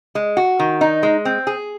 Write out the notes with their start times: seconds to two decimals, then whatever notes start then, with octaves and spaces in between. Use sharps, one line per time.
0.15 G#3
0.37 F#4
0.59 D#3
0.81 D#4
1.03 G#3
1.25 C4
1.47 G#4